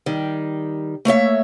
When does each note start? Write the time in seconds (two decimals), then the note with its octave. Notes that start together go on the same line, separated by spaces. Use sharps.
0.06 D#3 G3
1.05 A3 A#3 C#5 E5